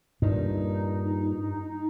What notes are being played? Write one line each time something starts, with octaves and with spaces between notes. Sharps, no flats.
G2 A#2 D#4